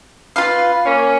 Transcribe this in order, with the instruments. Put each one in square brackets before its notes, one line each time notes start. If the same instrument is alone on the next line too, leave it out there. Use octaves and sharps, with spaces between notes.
[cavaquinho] F4 B4 F5
[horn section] A#3 C#4